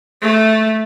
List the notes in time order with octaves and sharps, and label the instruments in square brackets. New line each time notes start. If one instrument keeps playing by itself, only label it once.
[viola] A3